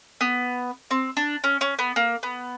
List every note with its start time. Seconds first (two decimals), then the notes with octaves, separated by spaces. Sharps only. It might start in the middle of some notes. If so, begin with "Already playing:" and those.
0.21 B3
0.91 C4
1.17 D4
1.44 C#4
1.61 C#4
1.79 B3
1.96 A#3
2.23 B3